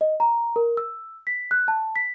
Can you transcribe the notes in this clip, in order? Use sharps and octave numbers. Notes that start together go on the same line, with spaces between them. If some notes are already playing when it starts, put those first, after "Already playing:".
D#5
A#5
A#4
E6
B6
F#6
A5
B6